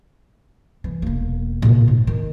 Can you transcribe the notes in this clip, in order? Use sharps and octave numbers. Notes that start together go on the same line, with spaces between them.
E3
E1 A#3
A#2 C#3
G#2
D#3